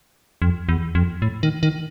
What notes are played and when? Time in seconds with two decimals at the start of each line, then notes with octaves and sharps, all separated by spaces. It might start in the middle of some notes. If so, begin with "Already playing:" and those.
0.42 F2
0.69 E2
0.95 F2
1.22 A2
1.43 D#3
1.63 D#3